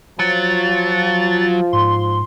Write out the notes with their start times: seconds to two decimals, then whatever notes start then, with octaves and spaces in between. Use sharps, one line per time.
0.19 F3 F#3 F4 A6
1.73 G#2 C6